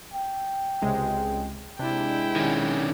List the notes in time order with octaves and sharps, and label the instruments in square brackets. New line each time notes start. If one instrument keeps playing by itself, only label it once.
[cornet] G5
[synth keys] C#2 C3 G#3
[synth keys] C3 D4 [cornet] G#3 [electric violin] E4 G5
[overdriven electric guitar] D#3 C#4